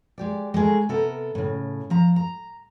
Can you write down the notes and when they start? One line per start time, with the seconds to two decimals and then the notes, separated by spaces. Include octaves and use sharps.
0.18 G#3 G4 D5
0.54 G#3 A3 G#4 A#4
0.89 C3 B3 A4 A#4
1.35 A2 C#3
1.90 F3 A#5
2.16 A#5